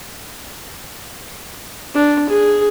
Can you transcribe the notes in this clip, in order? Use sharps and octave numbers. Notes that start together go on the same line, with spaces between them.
D4
G#4